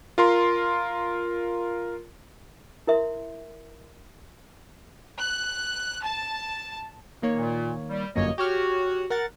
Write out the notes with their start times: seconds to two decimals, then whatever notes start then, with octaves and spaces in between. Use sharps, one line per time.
0.18 F4 A#4 C6
2.87 E4 A#4 E5 C6
5.20 F#6
6.03 A5
7.22 D#3 A#3 C#5
7.36 A#2
7.89 G3
8.16 G1 F#2 A#3 C#5 D#5
8.38 F#4 G4 C#5 F6
9.10 A#4 F#5 A6